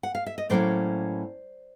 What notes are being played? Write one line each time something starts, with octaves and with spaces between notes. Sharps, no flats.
F#5
F5
E5
D#5
A2 F#3 A#3 C#4 C5 D5